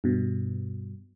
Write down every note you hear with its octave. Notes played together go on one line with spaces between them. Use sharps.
G2 B2